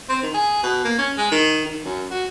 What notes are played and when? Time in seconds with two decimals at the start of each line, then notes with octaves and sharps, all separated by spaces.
0.09 C4
0.22 D#3
0.34 G#4
0.63 B2
0.84 A#3
0.98 C#4
1.17 G#3
1.31 D#3
1.66 D#3
1.84 F#2
2.11 F#4